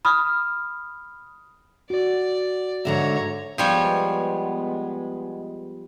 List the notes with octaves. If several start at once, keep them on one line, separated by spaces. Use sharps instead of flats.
B5 D#6 F6
F#4 D5
G#2 D3 C#5 E5 A#5
F3 G3 G#3 B3 C#5